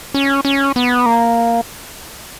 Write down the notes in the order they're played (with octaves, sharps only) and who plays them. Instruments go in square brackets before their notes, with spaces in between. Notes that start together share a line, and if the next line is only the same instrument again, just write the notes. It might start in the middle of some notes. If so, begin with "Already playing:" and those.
[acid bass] C#4
C#4
B3
A#3